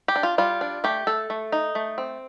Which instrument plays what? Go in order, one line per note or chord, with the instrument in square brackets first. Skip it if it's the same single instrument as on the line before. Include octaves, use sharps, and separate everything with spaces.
[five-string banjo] G4
D4
F4
G3 F4
D4
A3 G4
A3 A4
A3
D#4
A3
C4